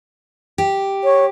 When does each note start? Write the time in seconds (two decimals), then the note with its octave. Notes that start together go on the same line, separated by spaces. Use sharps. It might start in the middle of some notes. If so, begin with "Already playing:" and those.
0.58 G4
1.04 C#5